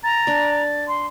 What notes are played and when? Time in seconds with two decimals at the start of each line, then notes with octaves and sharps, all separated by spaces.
0.04 A#5 A6
0.27 D4 D5
0.88 C6